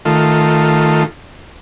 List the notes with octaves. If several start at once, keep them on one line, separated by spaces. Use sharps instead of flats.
D#3 A3 F4